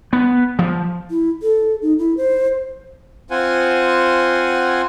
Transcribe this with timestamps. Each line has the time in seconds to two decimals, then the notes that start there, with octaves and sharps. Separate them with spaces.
0.13 B3
0.59 F3
1.10 E4
1.42 A4
1.82 D#4
1.99 E4
2.17 C5
3.31 C4 F4 C5 F#5 G#5